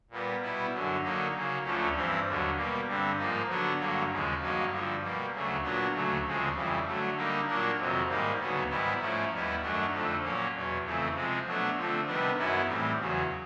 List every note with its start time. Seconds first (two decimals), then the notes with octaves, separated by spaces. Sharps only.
0.11 A#2 G3 B3
0.42 B2 G3 B3 E4
0.73 F#2 D3 F#3
1.03 D3 F#3 A#3 D#4
1.34 C#3 F#3 A#3
1.64 D2 D3 F3 A3 C#4
1.95 G2 E3 G3 C4
2.26 D#2 D3 F#3
2.56 B2 G3 A#3
2.87 G2 D3 G3 C4
3.18 G#2 F3 A#3 D#4
3.48 D3 F#3 B3 D4
3.79 G2 D3 F#3 A#3
4.10 D#2 C#3 F3 G#3
4.40 G2 D#3 F#3 A#3 D#4
4.71 G2 D3 F3
5.01 B2 G3 A#3
5.32 D2 C#3 F#3 A3
5.63 A#2 F#3 B3 D4
5.93 D2 C#3 F#3 A3
6.24 D2 C#3 F3 G#3 C4
6.55 F2 C#3 E3 G3
6.85 D3 F#3 A3
7.16 D3 G3 A#3 D#4
7.47 A#2 F#3 A#3 D4
7.77 F2 C3 D#3 F#3
8.09 G#2 D#3 G3 A#3
8.38 D2 C#3 F#3 B3
8.69 G#2 D#3 G3 B3 E4
9.00 G#2 F3 A3 C#4 E4
9.31 D#2 D#3 G3 B3 E4
9.61 F#2 D#3 F#3 A3 D4
9.92 F2 D3 F3 A3
10.23 A#2 F#3 A#3 C#4
10.53 E2 B2 F#3
10.84 F2 C#3 E3 A3 C4
11.14 C3 F3 G#3 C4
11.45 B2 F#3 A3 D4
11.76 D3 F3 A3 C4
12.06 C3 D#3 G3 B3 D4
12.37 F#2 D#3 F#3 B3 E4
12.68 A2 E3 G3 C4
12.98 E2 C#3 F#3